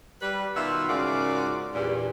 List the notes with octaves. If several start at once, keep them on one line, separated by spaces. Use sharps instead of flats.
G3 B4
B2 D#3 F4 F#4 B4 E5
G#2 C#3 F4 F#4 A#4 D5
E2 G2 A#2